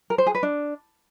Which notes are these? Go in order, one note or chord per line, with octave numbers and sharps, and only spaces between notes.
A#4
C5
G#4
B4
D4